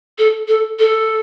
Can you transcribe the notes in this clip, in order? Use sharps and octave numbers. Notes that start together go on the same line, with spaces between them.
A4
A4
A4